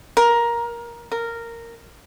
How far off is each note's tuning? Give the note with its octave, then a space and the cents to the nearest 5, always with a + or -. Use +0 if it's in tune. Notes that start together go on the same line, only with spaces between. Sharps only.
A#4 +15
A#4 -10